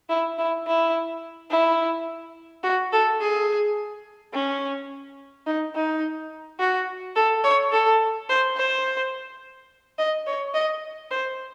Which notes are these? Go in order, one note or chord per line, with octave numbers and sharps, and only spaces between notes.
E4
E4
E4
E4
F#4
A4
G#4
C#4
D#4
D#4
F#4
A4
C#5
A4
C5
C5
D#5
C#5
D#5
C5